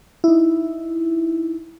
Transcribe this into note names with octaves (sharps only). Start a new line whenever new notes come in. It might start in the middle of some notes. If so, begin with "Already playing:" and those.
D#4 E4